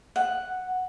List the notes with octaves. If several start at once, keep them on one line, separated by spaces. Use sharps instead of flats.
F#5